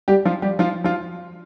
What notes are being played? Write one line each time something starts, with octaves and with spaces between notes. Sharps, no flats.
G3 G4
F3 F4
G3 G4
F3 F4
F3 F4